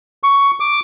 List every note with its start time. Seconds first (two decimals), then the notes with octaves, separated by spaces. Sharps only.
0.23 C#6
0.60 D6